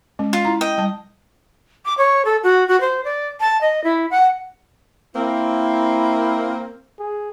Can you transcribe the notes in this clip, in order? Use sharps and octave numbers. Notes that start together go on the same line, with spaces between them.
G#3 C#4
F4
E4 A#5
D#5 G5
G3 A5
D6
C#5
A4
F#4
F#4
C5
D5
A5
D#5
E4
F#5
A#3 C4 E4
G#4